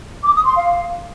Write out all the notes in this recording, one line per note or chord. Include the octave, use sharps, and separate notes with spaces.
D6
D#6
C6
F5